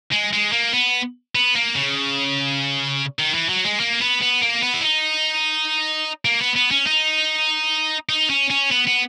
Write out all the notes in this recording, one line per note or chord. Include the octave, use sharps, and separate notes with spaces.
G#3
G#3
A#3
B3
B3
A#3
C#3
D#3
E3
F#3
G#3
A#3
B3
B3
A#3
B3
E4
D#4
A#3
B3
B3
C#4
D#4
D#4
C#4
C#4
B3
B3